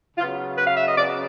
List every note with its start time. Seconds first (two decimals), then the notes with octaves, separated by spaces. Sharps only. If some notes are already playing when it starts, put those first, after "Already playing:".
0.17 C#3 F#3 B3 F4
0.58 B4
0.67 F5
0.77 E5
0.88 D#5
0.98 C#3 F#3 B3 D5